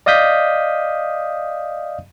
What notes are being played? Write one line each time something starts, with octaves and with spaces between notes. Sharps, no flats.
D5 D#5 F5 D#6 G6 B6